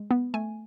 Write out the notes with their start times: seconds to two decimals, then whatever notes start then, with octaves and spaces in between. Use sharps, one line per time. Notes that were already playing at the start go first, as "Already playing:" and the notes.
Already playing: G#3
0.11 B3
0.34 A3 G#5